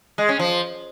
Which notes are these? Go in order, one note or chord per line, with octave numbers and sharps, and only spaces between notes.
G#3
C#4
F3